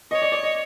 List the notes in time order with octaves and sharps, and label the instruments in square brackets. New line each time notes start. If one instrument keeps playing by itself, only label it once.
[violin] C#5 [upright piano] D#5
[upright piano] D5
D5
D#5